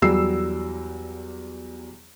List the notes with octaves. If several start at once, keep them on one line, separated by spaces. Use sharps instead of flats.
E2 F#3 G3 E6 C7